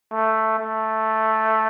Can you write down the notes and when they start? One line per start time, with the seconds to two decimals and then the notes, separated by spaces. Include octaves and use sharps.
0.12 A3
0.59 A3